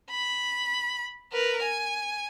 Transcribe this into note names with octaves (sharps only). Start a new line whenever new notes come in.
B5
A#4 B4
G#5